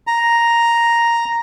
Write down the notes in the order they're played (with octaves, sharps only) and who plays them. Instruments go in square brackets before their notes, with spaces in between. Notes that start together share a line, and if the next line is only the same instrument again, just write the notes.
[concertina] A#5